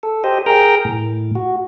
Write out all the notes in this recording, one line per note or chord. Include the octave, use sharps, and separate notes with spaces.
A4
G4 C5 D#5
G#4 A#4 G5 A#5
A2
F#4